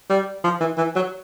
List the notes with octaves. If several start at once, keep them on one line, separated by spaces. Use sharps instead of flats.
G3
F3
E3
E3
F#3